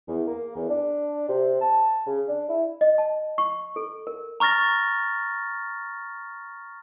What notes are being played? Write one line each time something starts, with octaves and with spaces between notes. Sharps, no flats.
E2
A#3
E2
D4
C3
A5
C#3
D4
E4
D#5
A5
C#6
A4
A#4
A#5 C#6 F6 A6 A#6